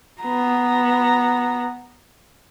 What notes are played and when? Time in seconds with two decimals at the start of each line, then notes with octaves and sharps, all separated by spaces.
0.22 B3 A#5